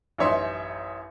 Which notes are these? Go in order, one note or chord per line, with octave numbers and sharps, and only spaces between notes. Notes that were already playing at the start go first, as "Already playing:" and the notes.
A1 F#2 D#4 C#5 E5 C6